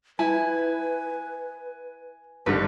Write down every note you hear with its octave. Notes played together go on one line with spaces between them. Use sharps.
E4 B4 G#5
G#1 G2 D3 G4 B4